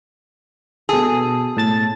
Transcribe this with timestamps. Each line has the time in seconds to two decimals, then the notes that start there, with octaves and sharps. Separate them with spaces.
0.89 B2 G#4 A4
1.57 A2 A5 A6